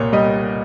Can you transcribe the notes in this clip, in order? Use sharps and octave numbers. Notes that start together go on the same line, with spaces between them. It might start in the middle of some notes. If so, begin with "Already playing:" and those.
Already playing: C2 A#2 C#5
G3 D#5